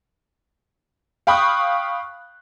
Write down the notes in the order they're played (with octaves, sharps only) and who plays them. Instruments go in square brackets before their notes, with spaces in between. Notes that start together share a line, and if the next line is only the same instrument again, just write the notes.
[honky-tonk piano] F5 G5 B5 C#6 D#6 F#6